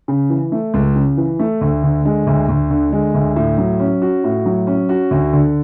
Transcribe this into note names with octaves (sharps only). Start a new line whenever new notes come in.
C#3
E3
A3
C#2
C#3
E3
A3
D2
D3
G#3
D2
D2
D3
G#3
D2
A2
F#3
C#4
F#4
A2
F#3
C#4
F#4
D2
D3